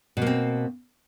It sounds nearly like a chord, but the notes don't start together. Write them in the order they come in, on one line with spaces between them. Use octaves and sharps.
B2 A#3 C4